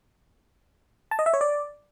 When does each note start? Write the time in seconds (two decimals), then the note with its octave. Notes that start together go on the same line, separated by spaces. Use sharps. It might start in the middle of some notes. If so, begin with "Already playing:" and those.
1.11 A5
1.19 D#5
1.26 E5
1.33 C#5
1.41 D5